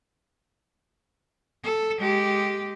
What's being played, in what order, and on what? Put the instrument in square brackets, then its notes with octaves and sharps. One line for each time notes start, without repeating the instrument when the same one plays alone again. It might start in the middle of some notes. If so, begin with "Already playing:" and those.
[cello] A4
G#3 G4